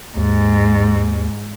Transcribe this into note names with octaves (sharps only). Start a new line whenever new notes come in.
D#2 G#2